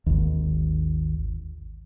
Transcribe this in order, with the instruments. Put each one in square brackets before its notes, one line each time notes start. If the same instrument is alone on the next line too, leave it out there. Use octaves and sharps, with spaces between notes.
[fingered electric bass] G#1 D#2